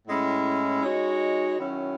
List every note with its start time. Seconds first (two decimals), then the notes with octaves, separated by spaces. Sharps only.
0.06 A2 G#3 C#4 E4
0.82 G#3 D#4 F#4 C#5
1.59 D#3 F#3 C#4 E4